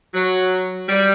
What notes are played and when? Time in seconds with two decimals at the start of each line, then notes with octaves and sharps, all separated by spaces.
0.14 F#3
0.89 G3